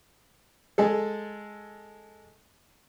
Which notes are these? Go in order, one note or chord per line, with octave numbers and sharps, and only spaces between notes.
G#3 G#4 A4